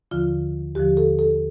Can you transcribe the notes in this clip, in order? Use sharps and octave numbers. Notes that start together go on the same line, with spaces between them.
D#2 D3 F3 F4
D#2 D3 F3 G4
A4
A4